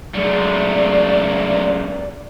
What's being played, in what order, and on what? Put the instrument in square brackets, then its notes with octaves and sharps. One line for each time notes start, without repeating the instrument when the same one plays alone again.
[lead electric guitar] F#2 G#3 [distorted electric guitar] F3 A3 [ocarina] D5